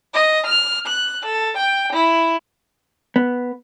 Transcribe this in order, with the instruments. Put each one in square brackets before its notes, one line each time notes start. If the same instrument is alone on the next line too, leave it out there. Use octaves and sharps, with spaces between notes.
[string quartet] D#5
F6
F#6
A4
G5
E4
[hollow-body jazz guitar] B3